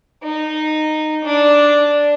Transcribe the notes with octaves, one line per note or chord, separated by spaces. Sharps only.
D#4
D4